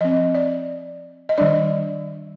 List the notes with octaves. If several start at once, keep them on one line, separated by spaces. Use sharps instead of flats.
F3 C4 D#5
D5
D#5
D#3 G3 D4 D5